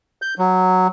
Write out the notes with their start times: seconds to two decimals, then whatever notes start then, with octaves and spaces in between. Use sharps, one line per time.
0.22 G6
0.39 F#3